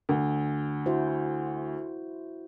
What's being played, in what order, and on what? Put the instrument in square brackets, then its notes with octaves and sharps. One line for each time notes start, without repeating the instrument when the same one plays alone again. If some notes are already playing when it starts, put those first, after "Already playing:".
[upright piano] D2
[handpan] E4 F#4 C5